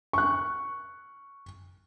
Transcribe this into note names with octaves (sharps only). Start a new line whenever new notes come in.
C#6 F#6